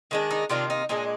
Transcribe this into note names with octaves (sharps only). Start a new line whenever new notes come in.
D#3 G#3 D4
D#4
C3 D#3 A#3 D4 F4
D#4
A#2 G#3 D4 D#4